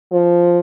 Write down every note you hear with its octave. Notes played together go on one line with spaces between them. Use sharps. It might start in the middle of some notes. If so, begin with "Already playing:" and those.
F3